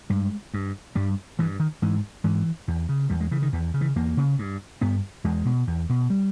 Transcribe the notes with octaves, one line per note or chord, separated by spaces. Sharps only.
G2 G#3
G2
G2 G3
G2 E3
D#3
G#2 E3
G#2 E3
E2
C#3
E2 G3
G#3
C#3 E3
D#3
E2 E3
C#3
E3
E2 A#3
C#3
G2
G2 B3
E2 G#3
B2
E2
B2
G3